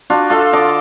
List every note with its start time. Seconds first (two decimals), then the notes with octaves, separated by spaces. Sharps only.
0.10 D4 F4 F#4
0.30 F4 A4 E5 F5
0.53 D3 D#5 D6